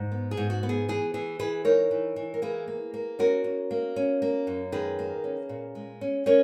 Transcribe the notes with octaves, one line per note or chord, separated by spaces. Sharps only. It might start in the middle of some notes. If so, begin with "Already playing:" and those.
Already playing: G#2
B3
G#4
G#2
F#4
B3
G#4
E3 G#4
E3 G#4
E3 G#4 B4
D#4 A#4 C#5
E3
E3
A#4
A#3 G#4 B4
A#3
A#3
C#4 F#4 A#4
C#4
A#3
C#4
A#3
F#2
D#3 G#4 B4
A#3
C#4
A#2
G#3
C#4
C#4 A#4 C#5